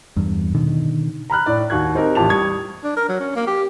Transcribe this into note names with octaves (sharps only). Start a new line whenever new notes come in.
E2 G2
B2 D3 D#3
A#5 B5 F6 F#6
A2 D5
D#2 F#4 C#6 F#6 G#6
C4 D#4 G4 A#4
A1 E2 F4 G4 A5 F7
G3 C#6 D#6 G#6
D4
A#4
F#3
C#4
A#3
G4